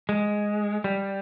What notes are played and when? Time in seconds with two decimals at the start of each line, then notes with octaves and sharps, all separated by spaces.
0.09 G#3
0.84 G3